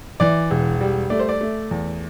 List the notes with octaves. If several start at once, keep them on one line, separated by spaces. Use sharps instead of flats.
E3 D5
E1
G3
A3 D5
C5
D5
A3
E2